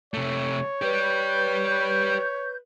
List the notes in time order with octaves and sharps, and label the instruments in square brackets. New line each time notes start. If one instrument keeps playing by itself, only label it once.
[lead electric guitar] C3 A3 [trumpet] C#5
[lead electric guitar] G4 D5 [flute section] B4 G6